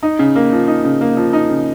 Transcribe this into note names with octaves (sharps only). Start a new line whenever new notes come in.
D#4
C#3
A#3
F3
D#4
C#3
A#3
F3
D#4
C#3